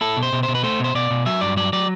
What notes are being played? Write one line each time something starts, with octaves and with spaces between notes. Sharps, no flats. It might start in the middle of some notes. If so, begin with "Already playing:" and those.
E4 A4
B2
C5
B2
C5
B2
B4
A3 C5
B2 C5
B2 D5
B2
F#3 E5
G2 D5
F#3 D5
F#3 D5